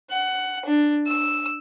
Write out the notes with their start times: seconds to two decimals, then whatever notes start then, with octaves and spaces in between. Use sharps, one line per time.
0.10 F#5
0.65 D4
1.07 E6